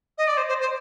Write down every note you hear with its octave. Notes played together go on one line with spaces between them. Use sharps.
D#5
D5
C5
C5
C5